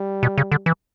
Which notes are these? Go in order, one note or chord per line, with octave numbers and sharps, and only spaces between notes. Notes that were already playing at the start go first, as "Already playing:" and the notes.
Already playing: G3
B2
C#3
D3
E3